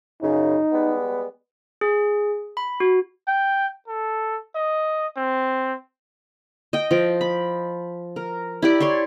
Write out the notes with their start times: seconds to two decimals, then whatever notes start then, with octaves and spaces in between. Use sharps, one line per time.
0.22 F#2 C#3 D#4
0.72 G3 G#3 B3
1.81 G#4
2.57 B5
2.80 F#4
3.28 G5
3.88 A4
4.56 D#5
5.17 C4
6.73 D#5 G5
6.91 F3 G5
7.21 B5
8.16 A#4
8.62 E4 G4 D5
8.80 C#5 D5 C6 C#6